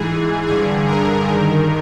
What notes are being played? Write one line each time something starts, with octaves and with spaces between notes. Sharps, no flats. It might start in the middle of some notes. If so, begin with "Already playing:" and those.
Already playing: G#2 E3 G#4
G2 D3 G#4
A#4
G2 D#3 A#4